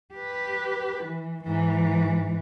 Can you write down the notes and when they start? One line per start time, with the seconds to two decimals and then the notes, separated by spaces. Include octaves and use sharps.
0.15 G4 B4
1.04 E3
1.44 G#2 E3